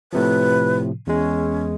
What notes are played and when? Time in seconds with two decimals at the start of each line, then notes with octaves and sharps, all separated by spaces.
0.13 A2 C3 F3 B4
1.07 E2 G#3 C#4